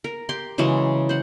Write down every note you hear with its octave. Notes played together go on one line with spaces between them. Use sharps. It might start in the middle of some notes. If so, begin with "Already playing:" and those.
A#4
G4 C6
C#3 E3 F#3 G#3
C5 F#5